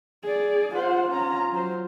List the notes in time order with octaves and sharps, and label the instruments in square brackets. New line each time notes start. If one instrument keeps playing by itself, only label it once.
[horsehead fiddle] G#4 D5
[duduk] F4 [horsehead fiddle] C5 F#5
[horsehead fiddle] C#4 A#5
F#3 C5